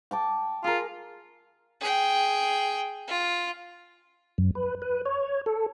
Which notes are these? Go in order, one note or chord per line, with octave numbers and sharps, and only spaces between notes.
G5 A5 D6
F4 G#4 A#4
G#4 G5
F4
F#2
B4
B4
C#5
A4